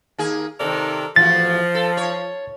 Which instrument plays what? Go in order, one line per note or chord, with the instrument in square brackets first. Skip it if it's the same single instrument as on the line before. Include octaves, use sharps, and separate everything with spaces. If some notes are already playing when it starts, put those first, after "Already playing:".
[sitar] D#2 A#3 G#4
[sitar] C3 D#3 [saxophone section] A4 A#4 D5
[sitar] E2 A2 F#4 [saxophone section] F3 [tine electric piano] A6
[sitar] A4
C#5